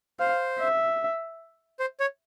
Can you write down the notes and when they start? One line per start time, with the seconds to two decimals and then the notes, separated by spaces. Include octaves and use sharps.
0.20 C5 F5
0.60 E5
1.80 C5
2.00 C#5